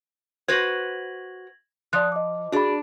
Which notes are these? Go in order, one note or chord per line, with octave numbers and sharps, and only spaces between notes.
F#4 B4 C5 G#6 A#6 F#7
F3 D5 D#6 F#6
D#5 D6
D4 F#4 G#4 D5 B5